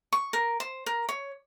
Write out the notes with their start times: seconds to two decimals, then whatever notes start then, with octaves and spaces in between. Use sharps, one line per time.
0.13 C#6
0.33 A#4
0.60 C5
0.86 A#4
1.09 C#5